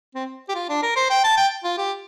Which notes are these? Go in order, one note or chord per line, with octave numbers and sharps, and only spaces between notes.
C4
G4
F4
D4
A#4
C5
G5
A5
G5
F4
G4